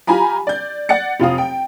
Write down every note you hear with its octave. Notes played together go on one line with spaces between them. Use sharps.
F4 G4 G#5 A#5 B5
D5 G6
D5 F#5 A6 C#7
F1 F4 F5 D#6
G5